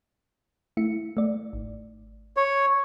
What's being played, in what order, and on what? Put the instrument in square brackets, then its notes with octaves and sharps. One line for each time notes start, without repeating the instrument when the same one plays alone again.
[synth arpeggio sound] A3 E4 C#7
A3 D5
G#1
[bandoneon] C#5